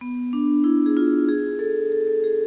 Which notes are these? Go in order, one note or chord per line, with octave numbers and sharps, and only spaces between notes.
B3
D4
E4
G#4
F4
G#4
A4
A4
A4
G#4